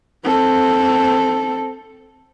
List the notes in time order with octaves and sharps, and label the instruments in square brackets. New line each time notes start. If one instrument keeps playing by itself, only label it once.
[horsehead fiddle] C4 A4